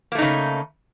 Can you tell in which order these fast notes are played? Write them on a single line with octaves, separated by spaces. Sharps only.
A#3 A3 D#4 C#3